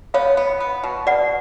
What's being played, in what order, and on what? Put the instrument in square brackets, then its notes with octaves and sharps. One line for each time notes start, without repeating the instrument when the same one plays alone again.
[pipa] B3 [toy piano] C#5 F5
[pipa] B3
B3
B2
[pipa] B2 [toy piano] D5 F#5